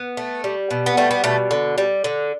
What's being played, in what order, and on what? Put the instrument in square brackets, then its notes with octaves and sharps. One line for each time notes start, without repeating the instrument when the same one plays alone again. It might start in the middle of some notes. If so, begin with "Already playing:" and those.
Already playing: [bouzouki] B3
A3
G3
B2
B3
G3 A3
B3
B2 A3
D3
G3
D3